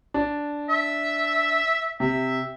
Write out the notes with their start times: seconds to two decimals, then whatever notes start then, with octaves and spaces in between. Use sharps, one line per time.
0.14 D4
0.69 E5
2.00 C3 E5